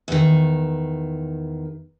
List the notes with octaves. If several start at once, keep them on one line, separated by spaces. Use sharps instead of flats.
E2 D#3